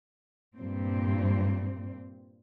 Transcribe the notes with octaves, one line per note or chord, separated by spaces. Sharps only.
G2 A#2 C4